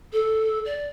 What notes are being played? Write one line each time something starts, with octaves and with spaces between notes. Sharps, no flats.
A4
D5